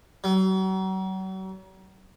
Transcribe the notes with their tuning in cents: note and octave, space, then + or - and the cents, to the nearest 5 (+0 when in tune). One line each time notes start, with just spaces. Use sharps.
F#3 +40